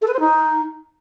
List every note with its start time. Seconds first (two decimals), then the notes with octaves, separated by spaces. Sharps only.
0.01 A4
0.07 B4
0.13 C5
0.19 D#4